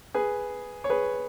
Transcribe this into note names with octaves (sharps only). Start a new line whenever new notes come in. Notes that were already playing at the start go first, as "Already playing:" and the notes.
G#4 B4
C#5
G#4 B4